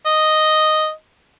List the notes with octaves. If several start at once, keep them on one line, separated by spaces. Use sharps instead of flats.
D#5